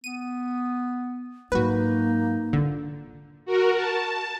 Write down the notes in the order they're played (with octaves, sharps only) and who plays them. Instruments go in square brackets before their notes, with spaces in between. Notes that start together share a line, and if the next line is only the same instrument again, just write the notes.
[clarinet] B3 [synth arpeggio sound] D#7
[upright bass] G#2 F#3 [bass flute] A#3 [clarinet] D#4 [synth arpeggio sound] F#4 B4
[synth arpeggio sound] D3 [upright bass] D4 F4
[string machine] F#4 A#4
A5